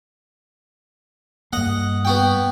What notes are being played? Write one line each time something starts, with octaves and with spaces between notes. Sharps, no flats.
G2 A#3 D#5 F#5
B3 F#4 G5